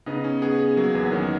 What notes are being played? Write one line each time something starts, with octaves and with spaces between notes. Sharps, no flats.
C#3 B3 D#4
C#4
B3 G#4
G#4
F#3 A#3
E2 B3
D#3 A#3 C#4